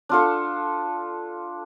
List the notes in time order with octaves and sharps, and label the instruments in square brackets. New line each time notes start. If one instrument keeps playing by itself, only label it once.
[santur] D4 F4 A4